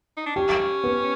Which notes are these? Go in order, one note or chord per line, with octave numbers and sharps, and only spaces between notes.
D#4
D4
C#4 G4
B3